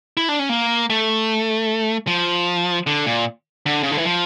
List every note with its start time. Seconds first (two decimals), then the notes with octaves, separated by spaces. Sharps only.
0.17 E4
0.29 D4
0.39 C#4
0.49 A#3
0.90 A3
2.07 F3
2.87 D3
3.06 A#2
3.66 D3
3.83 C#3
3.91 D3
3.97 E3
4.05 F3